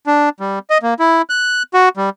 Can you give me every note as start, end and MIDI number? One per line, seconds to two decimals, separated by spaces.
0.07 0.29 62
0.40 0.59 55
0.70 0.78 75
0.83 0.94 58
1.00 1.22 64
1.30 1.63 90
1.74 1.89 66
1.97 2.09 55